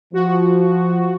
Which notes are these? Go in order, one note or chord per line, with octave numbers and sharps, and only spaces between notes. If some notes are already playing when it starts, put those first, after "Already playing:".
F3 F#4